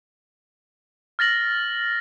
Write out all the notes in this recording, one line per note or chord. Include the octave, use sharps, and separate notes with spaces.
F6 A6 A#6 F#7